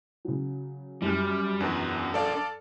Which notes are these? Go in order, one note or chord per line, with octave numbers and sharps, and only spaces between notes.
C#3 F#3
F#2 G3 F6
E2 D4 A#4
A4 D5 F5